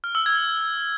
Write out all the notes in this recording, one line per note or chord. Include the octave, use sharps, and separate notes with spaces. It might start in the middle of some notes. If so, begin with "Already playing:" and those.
F6
E6
G#6